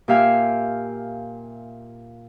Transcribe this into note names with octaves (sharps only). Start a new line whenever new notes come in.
A#2 G4 E5 F5 G5 G#5